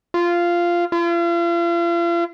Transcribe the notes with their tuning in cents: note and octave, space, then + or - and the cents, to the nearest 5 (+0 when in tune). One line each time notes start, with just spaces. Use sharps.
F4 -10
F4 -40